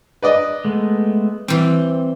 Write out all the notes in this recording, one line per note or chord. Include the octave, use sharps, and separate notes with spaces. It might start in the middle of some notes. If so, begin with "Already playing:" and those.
B4 D5 D#5
G#3 A3 B3
E3 G3 C4